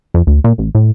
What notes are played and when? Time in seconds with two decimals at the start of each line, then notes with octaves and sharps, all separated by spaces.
0.14 F2
0.27 D2
0.44 A#2
0.58 A1
0.75 A2